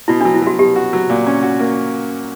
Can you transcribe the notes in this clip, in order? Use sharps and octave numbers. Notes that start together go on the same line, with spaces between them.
B2 E4
D4
F#3
E4
F#3 F#4
B2 G4
F#4
F#3
A#2
C#4
F#4
A#3